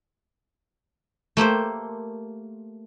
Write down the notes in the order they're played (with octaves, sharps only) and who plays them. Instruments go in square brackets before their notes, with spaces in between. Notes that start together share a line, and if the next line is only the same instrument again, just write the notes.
[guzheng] A3 A#3 G4 C5